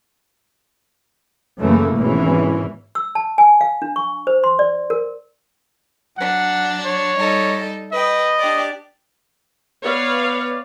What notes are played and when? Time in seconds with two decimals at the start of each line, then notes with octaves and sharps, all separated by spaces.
1.58 F#2 C#3 E3 A3 A#3
1.95 G#1 B2 E3 C#4
2.95 E6
3.15 A5
3.38 G#5
3.61 F5
3.82 D4
3.96 C#6
4.27 C5
4.44 C6
4.59 D5
4.90 A#4
6.18 F#3 D4 F#5
6.85 C#5
7.17 G3 D#4 A4
7.92 B4 D#5 G5
8.39 D4 G4 D5
9.84 B3 B4 C#5 D5 F5